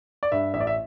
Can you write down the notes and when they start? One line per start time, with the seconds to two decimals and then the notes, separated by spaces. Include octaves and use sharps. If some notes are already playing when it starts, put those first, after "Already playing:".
0.23 D5
0.32 G2 E5
0.54 A1 E5
0.60 D5
0.67 E5